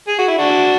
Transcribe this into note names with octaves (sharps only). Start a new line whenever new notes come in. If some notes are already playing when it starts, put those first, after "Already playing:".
G#4
F#4
E4
D4 F#4